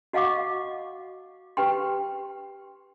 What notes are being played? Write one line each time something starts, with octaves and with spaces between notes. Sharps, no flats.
F#4 D#5 F5 F#5 C#6 D6
G4 B4 G5 C6